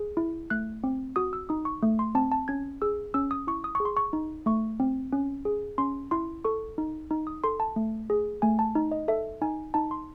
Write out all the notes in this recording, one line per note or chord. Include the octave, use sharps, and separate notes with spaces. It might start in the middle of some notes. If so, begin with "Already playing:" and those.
Already playing: G#4
E4
A3 F#6
C4
F#4 D#6
E6
D#4 D#6
C#6
A3
C6
C4 A5
A5
C#4 G#6
G#4 E6
C#4 E6
D#6
E4 C#6
D#6
G#4 C#6
C6
C#6
D#4
A3 C#6
C4
C#4
G#4
C#4 C6
E4 C6
A4 C#6
D#4
D#4
D#6
A4 C6
A5
A3
G#4
A3 G#5
A5
D#4
D#5
A4 E5
D#4 G#5
D#4 A5
C6